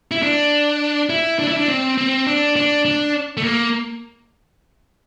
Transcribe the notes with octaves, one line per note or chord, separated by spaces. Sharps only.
E4
D4
E4
D4
E4
D4
C4
C4
D4
D4
D4
A3
A#3